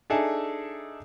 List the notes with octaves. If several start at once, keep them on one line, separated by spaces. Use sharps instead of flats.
D4 D#4 G#4 A4 E5